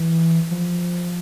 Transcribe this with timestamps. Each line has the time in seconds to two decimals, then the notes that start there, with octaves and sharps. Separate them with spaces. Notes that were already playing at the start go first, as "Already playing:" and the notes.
Already playing: E3
0.51 F3